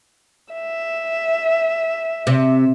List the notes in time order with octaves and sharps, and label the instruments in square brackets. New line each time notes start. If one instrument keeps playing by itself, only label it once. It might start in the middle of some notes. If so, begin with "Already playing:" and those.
[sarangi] E5
[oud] C3